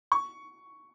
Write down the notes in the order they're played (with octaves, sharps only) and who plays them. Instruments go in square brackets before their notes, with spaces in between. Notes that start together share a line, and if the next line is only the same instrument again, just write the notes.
[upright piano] C#6